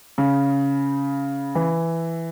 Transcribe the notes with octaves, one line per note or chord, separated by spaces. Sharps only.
C#3
E3